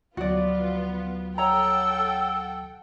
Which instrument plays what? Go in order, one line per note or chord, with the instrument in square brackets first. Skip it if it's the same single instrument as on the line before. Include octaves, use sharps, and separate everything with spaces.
[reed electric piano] D2 F#3 [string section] F3 B3 F4 [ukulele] F#4 D5
[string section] A4 F#5 G5 [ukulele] C#5 A#5 [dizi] E6